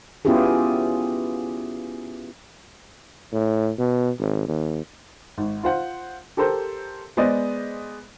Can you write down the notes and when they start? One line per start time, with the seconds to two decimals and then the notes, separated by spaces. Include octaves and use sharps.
0.25 B3 C#4 E4 F4 G4 G#4
3.32 A2
3.78 B2
4.20 G#1
4.48 D#2
5.38 G#1
5.63 F4 C5 F#5
6.37 G4 A4 A#4 C5
7.17 G#3 B3 C5 D5 D#5